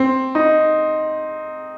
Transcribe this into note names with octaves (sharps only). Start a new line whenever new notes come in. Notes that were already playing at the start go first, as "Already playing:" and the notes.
Already playing: C4
D#4